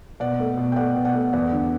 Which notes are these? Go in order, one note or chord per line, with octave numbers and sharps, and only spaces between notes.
B2 D5 F#5
A3
B2
G5
A3 D5 F#5
B2
D5 F#5
A3
E2 D5 F#5
D3